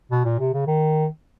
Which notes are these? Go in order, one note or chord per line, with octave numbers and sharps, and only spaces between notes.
B2
A#2
C3
C#3
D#3